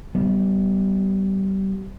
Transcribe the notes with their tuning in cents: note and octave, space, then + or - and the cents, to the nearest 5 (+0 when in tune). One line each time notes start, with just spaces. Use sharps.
G3 -25 B3 +5